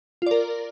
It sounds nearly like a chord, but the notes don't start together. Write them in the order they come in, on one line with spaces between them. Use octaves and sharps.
F4 D5 A#4